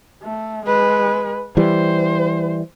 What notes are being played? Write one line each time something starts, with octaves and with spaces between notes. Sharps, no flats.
A3
G#3 B4
E3 G3 C5